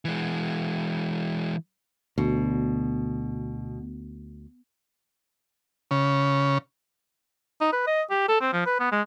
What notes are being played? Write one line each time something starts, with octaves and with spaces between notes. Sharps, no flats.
E3 G#3
D2 B2
C#3
D#4
B4
D#5
G4
A4
C4
F3
B4
B3
G#3